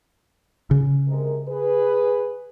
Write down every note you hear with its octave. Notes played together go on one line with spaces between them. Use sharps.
C#3
C3 G#3 A#4
G#4 B4